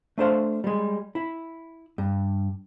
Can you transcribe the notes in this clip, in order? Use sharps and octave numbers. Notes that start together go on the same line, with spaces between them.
A3 D4 C5 F5
G3 G#3
E4
G2